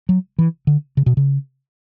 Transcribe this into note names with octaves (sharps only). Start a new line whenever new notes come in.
F#3
E3
D3
C#3
B2
C#3